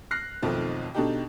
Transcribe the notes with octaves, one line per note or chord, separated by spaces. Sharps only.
F6 F#6 A#6 C7
B1 F2 D#3 F3 A3
B2 D3 D4 D#4 G4